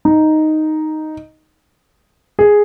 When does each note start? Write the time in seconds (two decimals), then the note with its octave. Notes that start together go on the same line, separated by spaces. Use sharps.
0.05 D#4
2.39 G#4